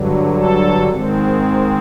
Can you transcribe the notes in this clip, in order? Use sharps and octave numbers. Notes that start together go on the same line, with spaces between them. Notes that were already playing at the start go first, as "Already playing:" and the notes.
Already playing: G2 D3 F#3
A4
G#2 D#3 G#3 C4